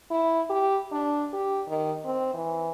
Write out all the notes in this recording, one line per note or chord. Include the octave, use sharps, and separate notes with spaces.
E4
G4
D4
G4
D#3
C4
E3